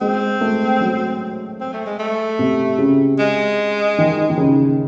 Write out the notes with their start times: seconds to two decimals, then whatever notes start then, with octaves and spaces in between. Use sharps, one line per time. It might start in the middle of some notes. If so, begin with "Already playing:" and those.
0.01 G#3 C4
0.41 A3
0.81 F#3
1.61 C4
1.73 A3
1.86 G#3
1.99 A3
2.39 C3
2.79 C#3
3.19 G#3
3.98 D#3
4.30 D#3
4.38 C#3